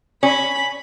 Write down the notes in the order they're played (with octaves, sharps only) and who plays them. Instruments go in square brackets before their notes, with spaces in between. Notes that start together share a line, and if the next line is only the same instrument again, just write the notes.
[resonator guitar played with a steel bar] C#4 [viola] B5